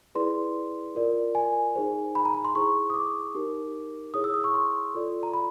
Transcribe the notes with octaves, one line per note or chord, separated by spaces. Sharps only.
E4 G#4 B4 D5 C6
F4 A#4 D5
G#5
D#4 G#4 C5
B5
A#5
B5
C6
E4 G#4 C5 C#6
D#6
D6
D#4 G4 A#4
E4 G#4 C#5 D#6
E6
D#6
C#6
C6
F4 A4 D5
A#5
B5